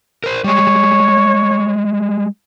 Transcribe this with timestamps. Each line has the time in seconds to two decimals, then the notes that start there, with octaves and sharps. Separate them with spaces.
0.24 A#4 C5
0.44 G3 G#3 C#5